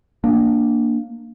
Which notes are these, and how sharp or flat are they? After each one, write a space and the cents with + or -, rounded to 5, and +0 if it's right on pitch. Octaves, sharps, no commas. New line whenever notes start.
A#3 +0 D4 +0